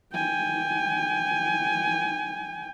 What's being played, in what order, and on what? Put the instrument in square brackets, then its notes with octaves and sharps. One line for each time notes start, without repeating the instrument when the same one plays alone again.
[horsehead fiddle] G5 G#5